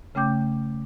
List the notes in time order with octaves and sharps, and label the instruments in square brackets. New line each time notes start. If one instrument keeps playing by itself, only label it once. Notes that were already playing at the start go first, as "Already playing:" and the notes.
[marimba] C#3 A3 C#4 G5 D6 G6